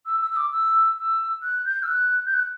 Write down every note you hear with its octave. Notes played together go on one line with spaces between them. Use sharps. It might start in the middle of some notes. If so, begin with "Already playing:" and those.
E6
E6
E6
D6
E6
E6
F#6
G6
E6
F#6
G6
F#6